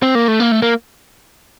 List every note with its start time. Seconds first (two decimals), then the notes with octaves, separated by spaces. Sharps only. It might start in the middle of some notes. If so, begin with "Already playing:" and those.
0.02 C4
0.15 A#3
0.28 A3
0.40 A#3
0.52 A3
0.62 A#3